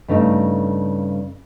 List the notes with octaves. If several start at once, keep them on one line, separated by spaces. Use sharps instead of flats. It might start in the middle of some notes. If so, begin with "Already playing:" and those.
G2 C#3 A3 D#4